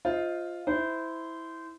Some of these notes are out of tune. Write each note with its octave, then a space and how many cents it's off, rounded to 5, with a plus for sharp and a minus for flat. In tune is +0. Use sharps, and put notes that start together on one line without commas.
F4 +0 C5 +0 D#5 +25
E4 -10 C5 -20